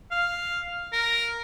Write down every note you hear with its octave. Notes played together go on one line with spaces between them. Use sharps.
F5
A#4